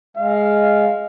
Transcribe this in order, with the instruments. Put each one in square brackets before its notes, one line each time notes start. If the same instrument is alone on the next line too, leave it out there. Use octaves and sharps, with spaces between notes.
[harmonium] G#3 [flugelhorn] F5